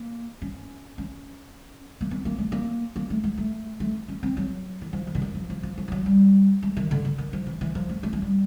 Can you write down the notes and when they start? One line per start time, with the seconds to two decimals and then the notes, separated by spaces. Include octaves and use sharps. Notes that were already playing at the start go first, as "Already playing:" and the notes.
Already playing: A#3
0.42 C#4
0.98 C#4
2.01 A#3
2.11 B3
2.25 A#3
2.38 A3
2.52 A#3
2.96 A#3
3.10 A3
3.24 G#3
3.38 A3
3.80 A3
4.08 C#4
4.23 C4
4.37 F#3
4.81 E3
4.93 F3
5.07 E3
5.15 D3
5.22 D#3
5.35 F3
5.50 F3
5.63 F3
5.78 F3
5.88 F3
5.92 F#3
6.06 G3
6.63 G#3
6.77 D#3
6.91 D3
7.05 D3
7.18 D#3
7.33 F3
7.46 E3
7.61 E3
7.75 F3
7.89 A3
8.03 A3
8.13 G#3
8.22 G3